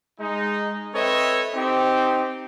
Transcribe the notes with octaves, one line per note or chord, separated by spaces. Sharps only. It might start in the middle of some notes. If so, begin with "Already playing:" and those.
G#3 D#4
C4 A4 B4 C#5 D#5 E5
C4 D#4 G4